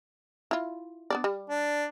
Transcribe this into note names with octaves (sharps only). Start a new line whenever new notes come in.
E4 F4
B3 D4 D5
G3
D4